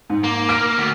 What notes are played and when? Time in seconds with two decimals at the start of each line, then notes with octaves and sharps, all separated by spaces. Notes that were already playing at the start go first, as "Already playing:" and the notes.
0.10 G#2
0.24 A#3
0.49 F6 A#6 D7
0.78 D2